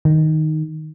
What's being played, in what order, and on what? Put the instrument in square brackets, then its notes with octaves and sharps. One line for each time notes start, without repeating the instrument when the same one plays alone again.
[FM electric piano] D#3